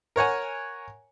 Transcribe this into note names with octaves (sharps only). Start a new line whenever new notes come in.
A#4 C#5 F#5 G#5